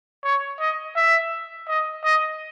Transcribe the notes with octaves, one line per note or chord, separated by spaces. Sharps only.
C#5
D#5
E5
D#5
D#5